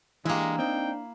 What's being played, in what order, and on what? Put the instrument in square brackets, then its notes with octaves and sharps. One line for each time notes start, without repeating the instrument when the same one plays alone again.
[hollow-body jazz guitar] E3 G4 [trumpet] G#3 [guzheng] A#3 E4 [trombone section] D4
[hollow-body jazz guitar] C4 D#4 [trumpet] G5